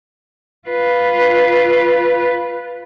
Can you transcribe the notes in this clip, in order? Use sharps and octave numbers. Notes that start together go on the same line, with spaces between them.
F4 B4